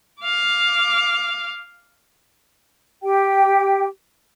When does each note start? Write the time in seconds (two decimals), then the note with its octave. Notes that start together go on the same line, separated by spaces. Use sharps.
0.23 F5 D6
3.03 G4 G5